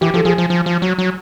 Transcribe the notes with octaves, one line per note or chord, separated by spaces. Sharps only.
E3 G4
F3 A4
F3 G#4
F3
F3
F3
F#3
F#3